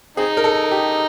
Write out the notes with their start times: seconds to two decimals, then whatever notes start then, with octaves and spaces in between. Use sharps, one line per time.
0.17 C4 D#4 G#4
0.37 A#4
0.44 A4
0.71 G4